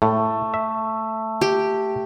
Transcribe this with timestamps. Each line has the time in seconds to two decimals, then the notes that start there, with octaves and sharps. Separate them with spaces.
0.02 A2 A3
0.54 E5
1.41 G4